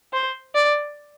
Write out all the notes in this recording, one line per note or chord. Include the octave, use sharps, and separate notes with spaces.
C5
D5